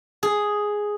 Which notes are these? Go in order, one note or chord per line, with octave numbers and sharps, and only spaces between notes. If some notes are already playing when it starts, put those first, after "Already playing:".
G#4